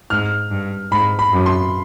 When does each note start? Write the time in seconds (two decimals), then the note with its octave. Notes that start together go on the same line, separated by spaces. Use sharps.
0.10 G#2 F6
0.51 G2
0.91 G#2 B5
1.19 B5
1.32 F#2
1.46 C6